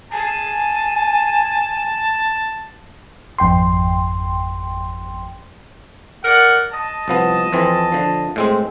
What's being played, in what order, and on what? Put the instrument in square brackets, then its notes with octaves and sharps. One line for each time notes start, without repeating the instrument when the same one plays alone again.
[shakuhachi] G#5 [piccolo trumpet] A5
[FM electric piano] G#1 F2 G5 C6
[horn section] A#4 D5 F#5
D#5 A5
[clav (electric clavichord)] C2 F3 B3
F2 E3 C4
D3 F3
A2 G#3 C4